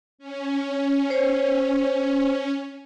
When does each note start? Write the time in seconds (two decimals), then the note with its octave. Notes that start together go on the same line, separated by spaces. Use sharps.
0.18 C#4
1.10 C5 C#5